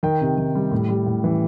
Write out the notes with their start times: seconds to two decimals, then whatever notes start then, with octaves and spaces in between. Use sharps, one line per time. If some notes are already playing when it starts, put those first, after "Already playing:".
0.03 D#3 G5
0.21 C3
0.38 D#3
0.55 G3
0.71 A2
0.89 G3
1.06 A2
1.24 E3